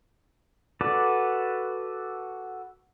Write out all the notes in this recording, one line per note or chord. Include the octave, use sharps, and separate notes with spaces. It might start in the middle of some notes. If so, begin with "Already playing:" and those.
F#4 A4 B4 D5